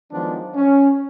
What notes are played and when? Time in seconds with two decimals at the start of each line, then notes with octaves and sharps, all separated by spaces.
0.13 D#3 F3 F#3 G#3 B3 D4
0.55 C#4